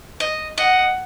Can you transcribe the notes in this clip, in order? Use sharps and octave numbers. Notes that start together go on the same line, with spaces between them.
D#5
D#5 F#5